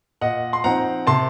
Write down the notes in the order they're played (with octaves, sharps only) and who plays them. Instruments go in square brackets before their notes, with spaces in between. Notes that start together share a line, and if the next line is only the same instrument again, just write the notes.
[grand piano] A#2 D#5 F#5
C6
F3 C4 D#4 F#5 A#5
C3 A5 C6